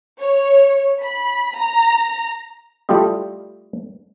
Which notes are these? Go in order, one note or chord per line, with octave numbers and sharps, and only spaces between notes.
C#5
B5
A#5
G3 A3 E4 F4 G4 D#5